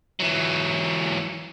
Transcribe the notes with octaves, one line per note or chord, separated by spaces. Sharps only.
E3 F#3